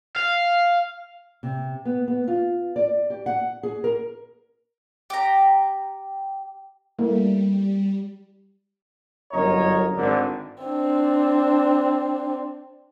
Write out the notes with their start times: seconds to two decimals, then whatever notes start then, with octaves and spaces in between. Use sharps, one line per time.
0.16 F5
1.43 C3
1.85 B3
2.08 B3
2.28 F4
2.76 D5
3.10 G4
3.26 F#5
3.63 G#4
3.84 A#4
5.10 G4 A#5
6.99 G3 A3 A#3 E4
9.32 G1 F#2 A#4 C#5 D#5 A#5
9.95 G#1 D3
10.64 C4 D4